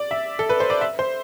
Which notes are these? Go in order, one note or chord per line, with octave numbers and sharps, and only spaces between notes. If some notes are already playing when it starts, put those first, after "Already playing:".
Already playing: D5
E5
A4
B4
C5
D5
E5
C5